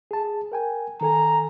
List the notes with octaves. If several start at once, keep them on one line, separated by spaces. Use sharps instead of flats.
G#4 A5
A#4 G5 G#5
D#3 A4 G#5 A#5